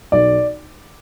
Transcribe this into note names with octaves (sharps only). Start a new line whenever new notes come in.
B1 D5